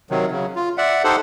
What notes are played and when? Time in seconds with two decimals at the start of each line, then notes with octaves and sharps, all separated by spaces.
0.11 C3 D#3 F#3
0.31 C#3 F#3
0.56 F4
0.78 D5 E5 F#5
1.04 D#4 G4 A4 C5 F#5